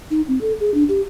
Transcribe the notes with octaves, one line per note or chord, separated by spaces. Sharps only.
D#4
C4
A4
G#4
D4
G4